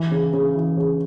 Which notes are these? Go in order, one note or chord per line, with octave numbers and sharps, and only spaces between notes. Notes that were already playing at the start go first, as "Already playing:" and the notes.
Already playing: E3
C#3
C#3
E3
C#3